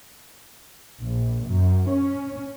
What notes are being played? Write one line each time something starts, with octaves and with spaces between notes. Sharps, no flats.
A#1
F#2
C#4